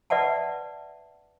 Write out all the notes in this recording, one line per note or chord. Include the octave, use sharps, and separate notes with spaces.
B4 D5 E5 F#5 A5